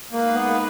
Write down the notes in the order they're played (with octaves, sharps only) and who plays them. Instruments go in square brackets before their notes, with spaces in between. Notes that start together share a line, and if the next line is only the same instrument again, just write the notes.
[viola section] G#3 D#4 G#4 B4 [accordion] A#3
[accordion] B3
A#3